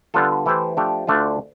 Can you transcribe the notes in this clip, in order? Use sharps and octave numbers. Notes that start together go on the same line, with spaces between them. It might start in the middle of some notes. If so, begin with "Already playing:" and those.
D3 G3 B3 F4 A4
E3 A3 E4 G4 C5
F3 A3 D4 G4
D2 D3 A3 D4 F4